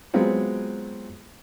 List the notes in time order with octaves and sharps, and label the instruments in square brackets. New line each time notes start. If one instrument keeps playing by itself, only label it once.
[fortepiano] F#3 G#3 B3 C4 F4